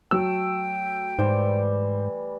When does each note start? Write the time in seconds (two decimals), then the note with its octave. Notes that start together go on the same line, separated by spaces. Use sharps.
0.11 F#3 A3 G5 E6
1.19 G#2 E3 G3 C5